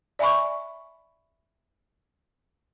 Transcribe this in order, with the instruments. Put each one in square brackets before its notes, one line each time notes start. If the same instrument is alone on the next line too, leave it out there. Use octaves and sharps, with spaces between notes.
[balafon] D5 E5 G#5 B5 C#6